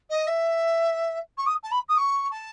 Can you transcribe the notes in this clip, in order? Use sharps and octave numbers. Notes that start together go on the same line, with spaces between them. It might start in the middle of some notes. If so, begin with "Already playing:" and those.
D#5
E5
C#6
D#6
A5
B5
D#6
C#6
A5